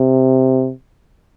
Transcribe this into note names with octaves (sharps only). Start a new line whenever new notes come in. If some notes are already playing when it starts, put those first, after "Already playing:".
Already playing: C3